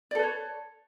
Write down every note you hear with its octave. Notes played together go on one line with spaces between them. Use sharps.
A4 B4 C#5 D5